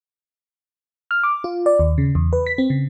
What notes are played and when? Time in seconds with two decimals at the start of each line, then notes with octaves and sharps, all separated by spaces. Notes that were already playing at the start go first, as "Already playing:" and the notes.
1.11 F6
1.23 D6
1.44 F4
1.66 D5
1.79 D#2
1.98 C#3
2.15 E2
2.33 B4
2.47 B6
2.58 C4
2.70 C#3